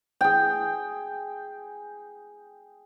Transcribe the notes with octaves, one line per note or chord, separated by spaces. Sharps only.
G#4 G5